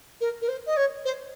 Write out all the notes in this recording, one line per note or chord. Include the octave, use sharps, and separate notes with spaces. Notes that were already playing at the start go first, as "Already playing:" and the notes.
A#4
A#4
C5
D#5
C#5
C5